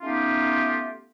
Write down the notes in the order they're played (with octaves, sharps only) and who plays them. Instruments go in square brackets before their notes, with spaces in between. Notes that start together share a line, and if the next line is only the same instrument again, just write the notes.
[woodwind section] A3 B3 C#4 D#4 F4 G4